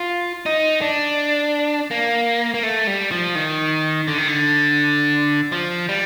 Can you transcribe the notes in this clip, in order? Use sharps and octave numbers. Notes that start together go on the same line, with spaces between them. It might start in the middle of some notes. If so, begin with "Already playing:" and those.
Already playing: F4
D#4
D4
A#3
A#3
A3
G3
F3
D#3
D3
D#3
D3
F3
G3